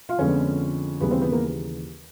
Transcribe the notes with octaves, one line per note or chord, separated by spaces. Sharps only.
F4 F5
F2 D3 F3 G#3 B3 C#4 C#5
D#2 C#3 E3 G3 A#3 B3 B4
C4 C5
B3 B4
A#3 A#4